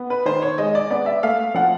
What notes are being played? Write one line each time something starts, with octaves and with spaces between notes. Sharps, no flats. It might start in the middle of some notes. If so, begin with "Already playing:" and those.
Already playing: B3
B4
D#3 C5
C#5
G#3 D#5
D5
B3 D5
E5
A3 F5
F3 F#5